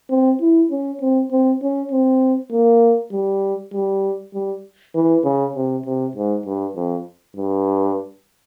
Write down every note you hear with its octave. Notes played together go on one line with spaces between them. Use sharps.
C4
E4
C#4
C4
C4
C#4
C4
A#3
G3
G3
G3
E3
C#3
C3
C3
G#2
G2
F2
G2